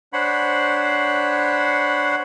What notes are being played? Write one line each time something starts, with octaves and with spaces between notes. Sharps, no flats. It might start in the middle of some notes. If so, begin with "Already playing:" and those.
D4 C5 C#5 F#5 B5